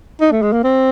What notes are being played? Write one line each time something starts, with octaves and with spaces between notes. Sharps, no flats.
D#4
A3
G#3
A#3
C4